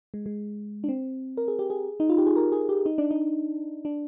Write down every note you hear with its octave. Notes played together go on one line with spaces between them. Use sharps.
G#3
G#3
D4
C4
A#4
G#4
G4
G#4
D#4
F4
G4
G#4
A#4
G#4
G4
D#4
D4
D#4
D4